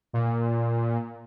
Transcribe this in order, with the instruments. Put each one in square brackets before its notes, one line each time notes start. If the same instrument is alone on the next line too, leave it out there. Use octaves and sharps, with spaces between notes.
[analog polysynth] A#2